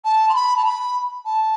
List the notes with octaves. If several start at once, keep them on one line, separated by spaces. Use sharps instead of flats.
A5
C6
B5
A5
B5
A5